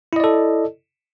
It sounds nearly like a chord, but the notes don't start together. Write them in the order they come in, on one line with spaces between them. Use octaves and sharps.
E4 D#5 D5 A4